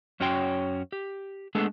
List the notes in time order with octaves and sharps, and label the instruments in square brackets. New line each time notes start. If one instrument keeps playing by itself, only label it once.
[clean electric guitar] F#2 C#4 F#4 C#5 G5 C6
G4
G#3 A3 B3 D4 G#4 A4